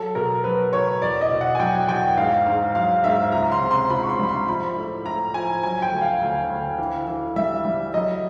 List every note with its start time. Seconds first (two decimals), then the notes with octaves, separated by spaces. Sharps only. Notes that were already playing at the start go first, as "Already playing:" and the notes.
Already playing: F#3 A4
0.15 B2 A#4
0.44 F#3 B4
0.73 B2 C#5
1.02 E2 D5
1.21 D#5
1.31 B2
1.41 F#5
1.55 G#5
1.60 F#3 G5
1.88 E2 G5
2.17 G#2 F5
2.47 G#2
2.75 F#3 F5
3.04 G#2 E5
3.32 C#2 A#5
3.52 C6
3.61 C3
3.71 C6
3.90 C#2 B5
4.03 C#6
4.09 C6
4.19 G3 B5
4.29 C6
4.48 F3 B5
4.77 A2
5.06 A2 A#5
5.34 F3 G#5
5.63 F#3 G#5
5.82 G5
5.92 D2
6.01 F5
6.21 D2
6.50 D2
6.79 E3
7.08 E3
7.36 G3 E5
7.65 G3
7.94 F#3 D#5